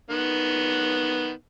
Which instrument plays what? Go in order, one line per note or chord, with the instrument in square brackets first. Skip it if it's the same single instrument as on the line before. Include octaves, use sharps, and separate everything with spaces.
[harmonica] D#3 B3 F#5